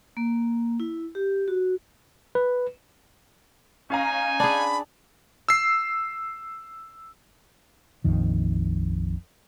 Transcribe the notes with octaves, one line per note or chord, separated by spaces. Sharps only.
A#3
E4
G4
F#4
B4
C#4 D#4 F5 G#5 A#5
D4 G#4 B5
E6 C7
A#1 F2 D#3